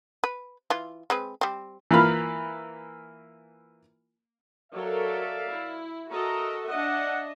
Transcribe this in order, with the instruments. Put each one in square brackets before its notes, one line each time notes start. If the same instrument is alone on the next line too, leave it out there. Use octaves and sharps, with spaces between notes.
[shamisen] B4
E3 F4
G#3 C4 B4
G3 C4
[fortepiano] E3 A#3 F4 B5 F6
[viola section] F#3 A4 A#4 [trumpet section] D5 E5 F5
[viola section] E4
[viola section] F#4 A4 D#5 [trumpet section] A#4 E5 A#5
[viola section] D4 D#5 E5 [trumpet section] F#5